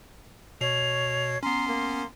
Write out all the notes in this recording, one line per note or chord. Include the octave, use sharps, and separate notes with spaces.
B2 C#5 C7 F7
B3 C#4 A#5 C6
A#3